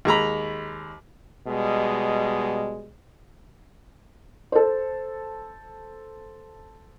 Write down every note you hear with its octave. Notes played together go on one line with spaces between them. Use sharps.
D#2 G#3 A#5 B5
B2 G3 G#3
A4 C5